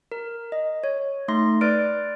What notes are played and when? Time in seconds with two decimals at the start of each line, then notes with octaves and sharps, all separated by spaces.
0.12 A#4
0.52 D#5
0.84 C#5
1.28 A3 D#4 C6 A#6
1.61 B4 D5 F6 D7